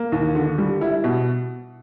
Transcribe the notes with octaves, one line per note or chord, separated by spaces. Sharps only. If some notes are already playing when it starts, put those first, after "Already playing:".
Already playing: A#3
D#2
D3
G3
E4
B2